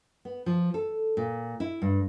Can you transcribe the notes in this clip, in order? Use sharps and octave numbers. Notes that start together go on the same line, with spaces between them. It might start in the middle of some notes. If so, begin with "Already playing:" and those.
B3
F3
A4
A#2
E4
G2